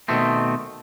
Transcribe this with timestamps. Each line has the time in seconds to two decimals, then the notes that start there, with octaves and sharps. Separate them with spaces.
0.08 B2 D#3 A3 C4